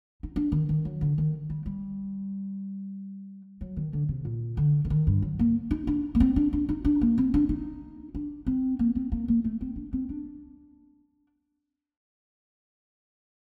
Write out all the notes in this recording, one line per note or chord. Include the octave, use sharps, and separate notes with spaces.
D#4
D4
D#3
D#3
F#3
D3
D#3
G3
G3
F#3
D#3
D3
C3
A#2
D3
D3
D#3
G2
F#3
A#3
D#4
D4
A#3
C4
D4
D4
D#4
D4
A#3
C4
D4
D#4
D4
C4
A#3
C4
A#3
A#3
A3
C4
D4
C4
D4